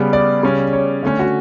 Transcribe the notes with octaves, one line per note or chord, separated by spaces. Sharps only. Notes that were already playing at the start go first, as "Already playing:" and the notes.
Already playing: C#3 G3 B3
D5
C#3 G3 C#4
C#5
D3 A3 C#4
F#4